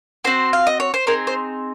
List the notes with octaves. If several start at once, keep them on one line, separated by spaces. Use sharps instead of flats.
C4 F#4 C5
F5
D#5
C#5
C5
C4 D#4 G#4 A#4
C5